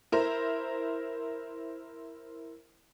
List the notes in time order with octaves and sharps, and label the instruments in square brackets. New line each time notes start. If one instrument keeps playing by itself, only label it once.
[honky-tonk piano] E4 A#4 C5